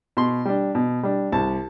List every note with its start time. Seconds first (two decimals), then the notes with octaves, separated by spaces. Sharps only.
0.17 B2 C6
0.45 G3 D4
0.75 B2
1.03 G3 D4
1.32 C2 A5